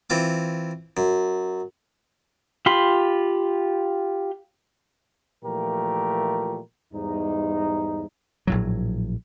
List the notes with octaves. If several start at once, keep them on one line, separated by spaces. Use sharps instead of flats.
E3 C4 F4 D6
F#2
F4 G4 B5 C6
A#2 E3 F3 A3 G4 A#4
E2 G#2 G3 D#4
A#1 A2 F#3